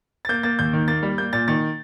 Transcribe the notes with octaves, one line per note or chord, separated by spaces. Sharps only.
A6
A#3 G6
A#3 A6
D#2 G6
D#3
A#3 A6
G3
A#3 G6
A#2 A6
D#3 A6